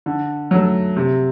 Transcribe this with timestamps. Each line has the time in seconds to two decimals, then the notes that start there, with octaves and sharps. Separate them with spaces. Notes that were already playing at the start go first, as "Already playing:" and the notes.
0.06 D3
0.51 F#3 A3
0.96 C3